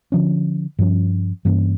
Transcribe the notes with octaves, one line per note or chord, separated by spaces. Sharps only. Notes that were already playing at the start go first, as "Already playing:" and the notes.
D3 F3 C#4
G2 F3 C#4
G2 E3 A#3 C#4